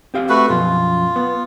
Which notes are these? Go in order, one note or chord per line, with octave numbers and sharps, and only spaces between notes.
C4 G4 F5
A3 F#4 B4
F#2 B2 F3 F4
B3